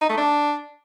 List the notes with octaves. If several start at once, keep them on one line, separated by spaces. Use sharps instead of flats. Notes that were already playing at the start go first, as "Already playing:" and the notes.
D#4
A3
D4